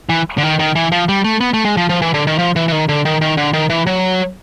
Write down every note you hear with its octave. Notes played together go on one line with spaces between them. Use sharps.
E3
D3
D#3
D#3
E3
F3
G3
A3
B3
A3
G#3
F3
F3
E3
D3
D#3
F3
E3
E3
D#3
D3
D#3
D#3
D3
D#3
E3
F#3